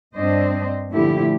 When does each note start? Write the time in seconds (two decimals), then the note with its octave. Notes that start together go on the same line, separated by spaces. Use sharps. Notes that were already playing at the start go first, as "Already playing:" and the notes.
0.14 G2 C4 D4 C5 D#5
0.91 A#2 D3 F3 A3 E4 G4